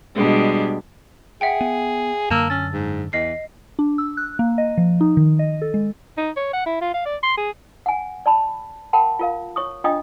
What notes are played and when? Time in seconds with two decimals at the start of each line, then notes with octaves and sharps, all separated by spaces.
0.15 B2 G3 G#3 D4 G4
1.41 G#4 E5 F#5 G5
1.61 B3
2.30 F#2 D3 A#3 A5 E6
2.50 C#4 A6
2.73 G#2
3.13 E2 D#5 C7
3.79 D4
3.98 E6
4.17 F#6
4.39 A#3
4.58 D#5
4.78 F3
5.01 D#4
5.17 D#3
5.39 D#5
5.62 A4
5.74 G#3
6.17 D#4
6.37 C#5
6.53 F#5
6.66 E4
6.81 F4
6.94 F5
7.06 D5
7.23 C6
7.37 G#4
7.86 F#5 G#5
8.26 D5 A5 B5
8.93 A#4 F#5 G5 A5 B5
9.19 F4 A#4 F5
9.56 C#5 C#6 D#6
9.84 D4 F4 D#5 G5 D#6